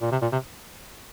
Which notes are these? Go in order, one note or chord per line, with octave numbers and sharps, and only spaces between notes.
A#2
C3
A#2
C3